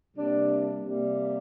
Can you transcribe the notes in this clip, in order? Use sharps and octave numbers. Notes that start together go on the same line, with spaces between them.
C3 G3 A#3 D4
C3 G3 A#3